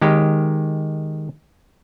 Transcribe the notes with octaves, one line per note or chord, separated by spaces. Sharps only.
D#3 G#3 G4